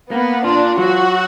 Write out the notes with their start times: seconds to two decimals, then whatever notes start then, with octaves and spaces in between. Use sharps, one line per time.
0.11 A#3 B3
0.44 D4 F4
0.78 F#3 F#4